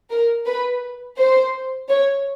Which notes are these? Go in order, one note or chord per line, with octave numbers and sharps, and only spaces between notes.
A#4
B4
C5
C#5